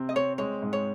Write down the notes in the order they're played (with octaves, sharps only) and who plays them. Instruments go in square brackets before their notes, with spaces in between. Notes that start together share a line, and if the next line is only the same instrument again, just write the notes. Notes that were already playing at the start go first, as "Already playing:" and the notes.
Already playing: [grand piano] C3 C4
[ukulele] D#5
[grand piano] C4 [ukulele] C#5
[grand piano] G#3 [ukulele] C#5
[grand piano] G#2
[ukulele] C#5